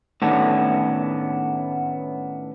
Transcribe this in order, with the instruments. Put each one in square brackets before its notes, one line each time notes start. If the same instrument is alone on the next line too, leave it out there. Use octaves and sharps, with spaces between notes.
[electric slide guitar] A2 D#3 A3 B3 C#4 D4